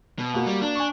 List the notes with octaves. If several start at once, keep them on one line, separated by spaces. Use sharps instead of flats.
B2
A#3 F#4
G3
D4
G#5 C#6